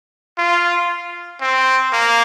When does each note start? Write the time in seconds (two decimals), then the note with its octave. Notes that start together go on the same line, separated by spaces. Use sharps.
0.38 F4
1.41 C4
1.93 A#3